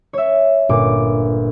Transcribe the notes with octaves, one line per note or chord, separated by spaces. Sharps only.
C#5 E5
G1 A#2 D6